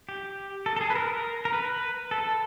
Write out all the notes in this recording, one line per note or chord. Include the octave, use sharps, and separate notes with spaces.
G4
A4
A4
G#4
B4
A#4
A#4
B4
A4